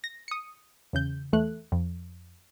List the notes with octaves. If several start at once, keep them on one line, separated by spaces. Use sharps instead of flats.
A#6
D#6 C#7
E2 C#3 G6
E2 A3 F#6
F2